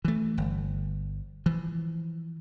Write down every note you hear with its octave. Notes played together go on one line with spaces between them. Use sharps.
E3 A3
G1
E3 F3